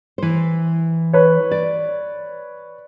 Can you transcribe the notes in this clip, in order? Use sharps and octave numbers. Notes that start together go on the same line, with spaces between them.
E3 C5
B4 C#5
D5